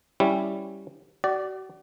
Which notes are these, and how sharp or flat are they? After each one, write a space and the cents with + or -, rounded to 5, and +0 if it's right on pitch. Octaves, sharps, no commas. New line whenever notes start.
G3 +0 C#4 +0 E4 +0
F#4 +40 D5 +0